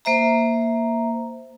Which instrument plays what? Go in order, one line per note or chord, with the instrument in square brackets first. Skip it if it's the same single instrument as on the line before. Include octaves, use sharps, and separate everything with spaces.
[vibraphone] A#3 C5 E5 A#5